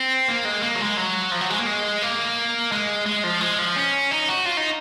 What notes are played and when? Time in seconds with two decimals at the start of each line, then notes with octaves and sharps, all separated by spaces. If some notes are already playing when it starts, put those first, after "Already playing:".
Already playing: C4
0.28 A#3
0.45 G#3
0.63 A#3
0.75 F#3
0.80 G#3
0.97 F#3
1.32 F3
1.41 F#3
1.50 G#3
1.59 A#3
1.67 G#3
2.02 A#3
2.72 G#3
3.06 G#3
3.24 F3
3.41 G#3
3.59 F3
3.76 C#4
4.11 D#4
4.28 F#4
4.46 F4
4.57 D#4